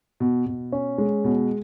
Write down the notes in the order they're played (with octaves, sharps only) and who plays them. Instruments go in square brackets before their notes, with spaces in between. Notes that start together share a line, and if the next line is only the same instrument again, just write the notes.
[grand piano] B2
B2
C#4
G#3
B2